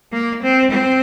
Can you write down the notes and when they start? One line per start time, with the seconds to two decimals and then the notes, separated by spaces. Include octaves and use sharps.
0.12 A#3
0.43 C4
0.71 C4